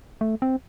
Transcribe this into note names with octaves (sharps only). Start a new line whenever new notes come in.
A3
C4